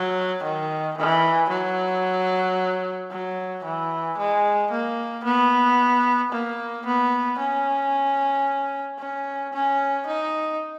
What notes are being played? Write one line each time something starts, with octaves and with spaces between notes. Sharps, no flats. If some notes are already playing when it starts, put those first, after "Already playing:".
Already playing: F#3
D#3
E3
F#3
F#3
E3
G#3
A#3
B3
A#3
B3
C#4
C#4
C#4
D#4